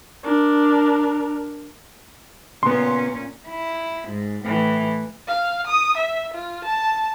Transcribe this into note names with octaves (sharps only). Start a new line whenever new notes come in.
D4 A#4
A#2 C#3 B3 C#4 C6
E4
G#2
A2 E3
F5
D#6
E5
F4
A5